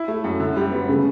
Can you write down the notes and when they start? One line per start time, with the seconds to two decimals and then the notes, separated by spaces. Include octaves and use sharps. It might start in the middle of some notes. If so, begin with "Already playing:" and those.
Already playing: E4
0.08 A3
0.24 F#2
0.40 D3
0.56 G3
0.72 B3
0.88 C#3 A3